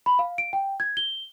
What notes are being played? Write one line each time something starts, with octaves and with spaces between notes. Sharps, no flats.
B5
F5
D7
G5
G#6
G7